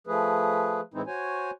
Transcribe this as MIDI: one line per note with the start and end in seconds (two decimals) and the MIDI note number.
0.07 0.81 53
0.07 0.81 57
0.07 0.81 68
0.07 0.81 71
0.94 1.02 45
0.94 1.02 52
0.94 1.02 56
0.94 1.02 60
0.94 1.02 63
0.94 1.02 64
1.07 1.51 66
1.07 1.51 72
1.07 1.51 73
1.07 1.51 80